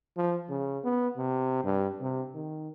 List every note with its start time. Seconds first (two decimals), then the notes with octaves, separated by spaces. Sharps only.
0.17 F3
0.49 C#3
0.84 B3
1.17 C3
1.64 G2
2.01 C3
2.34 D#3